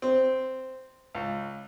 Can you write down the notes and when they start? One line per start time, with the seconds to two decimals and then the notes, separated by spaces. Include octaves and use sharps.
0.02 C4
1.15 C#2